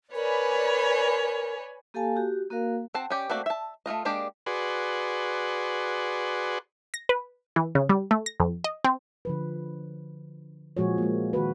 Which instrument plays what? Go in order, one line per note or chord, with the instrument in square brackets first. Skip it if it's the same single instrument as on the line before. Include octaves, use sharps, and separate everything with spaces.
[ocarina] A#4 [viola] B4 C#5 [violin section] D5 G#5 B5
[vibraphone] A#3 G4 A4 F5 G#5 A5
F#4 G4
A#3 F#4 A#4 F5
[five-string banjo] C4 F#4 C5 A5
C#4 G4 D5
A3 A#3 C4 F#4 D5
E5 A5
A3 E4 F4 D#5
G#3 A#3 D4 G4 D5
[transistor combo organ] F#4 G#4 B4 D5 C6
[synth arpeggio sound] A#6
B4
E3
C#3
G3
A3
A#6
F2
D#5
C4
[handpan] D3 F3 B4
A#2 F3 G#3 F#4 G#4 C#5
G#3 A#3
D#3 F#4 B4